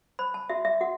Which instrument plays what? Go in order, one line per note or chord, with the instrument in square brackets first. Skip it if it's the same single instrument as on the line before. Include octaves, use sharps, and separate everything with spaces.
[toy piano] C5 B5
A5
F#4 E5
E5
F#4 F#5